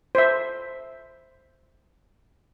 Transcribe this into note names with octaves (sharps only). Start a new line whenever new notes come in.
C5 E5